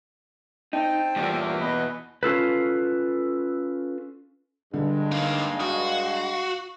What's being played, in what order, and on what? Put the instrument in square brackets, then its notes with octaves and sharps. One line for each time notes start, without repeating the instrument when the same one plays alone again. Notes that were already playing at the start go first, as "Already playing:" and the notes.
[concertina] C4 G5 A5 [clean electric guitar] D#4
[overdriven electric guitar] E2 E3 [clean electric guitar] G2 A#2
[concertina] F#4 A#4
[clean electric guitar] B2 [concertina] B4 D#5
[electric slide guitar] C#4 F4 A4 B4
[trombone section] G2 G#3 [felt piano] D3 [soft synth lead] G3
[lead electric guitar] A#3 D#4 [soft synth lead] F5
[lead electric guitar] F#4 [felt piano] D#6